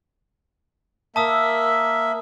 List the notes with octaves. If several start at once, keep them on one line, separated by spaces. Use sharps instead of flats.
A#3 E5 A5 D#6 E6